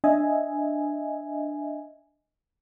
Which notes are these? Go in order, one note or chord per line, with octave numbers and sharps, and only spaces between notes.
D4 D#5 E5 G#5